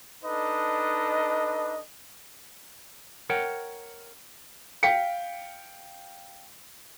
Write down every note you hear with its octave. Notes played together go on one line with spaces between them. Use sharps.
D4 D#4 A4 B4 D#5
A#4 C#5 F#5 G5
F5 G5 B6 C#7